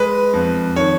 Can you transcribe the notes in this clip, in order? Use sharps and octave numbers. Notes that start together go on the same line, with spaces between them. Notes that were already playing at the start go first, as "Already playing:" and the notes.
Already playing: G#3 B4
F2
D#3 C#5